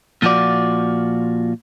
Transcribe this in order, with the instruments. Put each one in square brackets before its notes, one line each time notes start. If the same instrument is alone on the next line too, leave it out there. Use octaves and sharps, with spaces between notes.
[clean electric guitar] A#2 F3 F4 F#4 D5